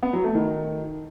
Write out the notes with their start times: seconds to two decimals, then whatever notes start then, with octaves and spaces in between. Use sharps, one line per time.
0.03 B3
0.13 F#3
0.24 A3
0.35 D#3